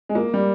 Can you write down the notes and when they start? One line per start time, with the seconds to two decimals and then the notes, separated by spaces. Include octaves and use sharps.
0.09 G#3
0.15 A#3
0.34 G3